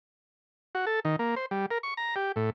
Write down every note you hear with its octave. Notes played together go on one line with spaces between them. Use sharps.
F#4
A4
D#3
A#3
C5
G3
A#4
C#6
A#5
G4
A2